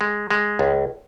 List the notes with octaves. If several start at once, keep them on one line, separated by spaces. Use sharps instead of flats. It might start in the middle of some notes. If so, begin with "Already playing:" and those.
G#3
G#3
C#2